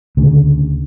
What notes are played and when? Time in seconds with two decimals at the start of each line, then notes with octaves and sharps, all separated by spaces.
0.17 D2 C#3